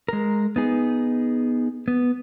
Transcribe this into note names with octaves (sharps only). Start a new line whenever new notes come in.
G#3 A#4
B3 D#4 G#4
B3